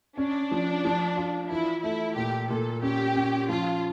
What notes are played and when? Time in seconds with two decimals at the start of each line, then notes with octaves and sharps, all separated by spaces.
0.17 C#4 D4
0.51 F3
0.85 F3
1.17 F4
1.50 E3 E4
1.83 A3 E4
2.16 A#2 G4
2.50 A#2 A4
2.82 C#4 G4
3.16 C#4
3.49 F3 F4